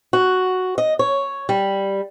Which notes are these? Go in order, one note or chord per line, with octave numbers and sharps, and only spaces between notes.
F#4
D#5
C#5
G3